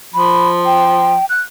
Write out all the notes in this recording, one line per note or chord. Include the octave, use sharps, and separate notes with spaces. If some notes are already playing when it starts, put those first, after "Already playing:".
F3 B5
G5
F#6